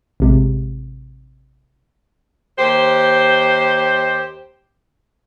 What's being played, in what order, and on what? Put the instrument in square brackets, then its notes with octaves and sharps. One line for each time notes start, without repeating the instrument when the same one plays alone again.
[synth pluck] A1 C3 G#3
[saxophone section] D#2 G4 C5